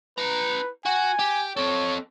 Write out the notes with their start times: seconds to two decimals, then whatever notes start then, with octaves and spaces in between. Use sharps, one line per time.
0.18 E4 B4 A#5
0.86 F#4 G#5
1.19 G4
1.57 C4 A4 C#5